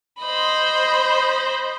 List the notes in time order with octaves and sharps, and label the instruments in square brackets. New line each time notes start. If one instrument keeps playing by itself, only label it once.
[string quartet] C5 D#5 B5